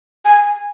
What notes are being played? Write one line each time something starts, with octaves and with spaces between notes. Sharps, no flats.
G#5